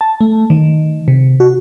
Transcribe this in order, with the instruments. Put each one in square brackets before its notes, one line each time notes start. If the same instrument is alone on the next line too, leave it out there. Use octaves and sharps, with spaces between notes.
[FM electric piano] A5
A3
D#3
C3
F#4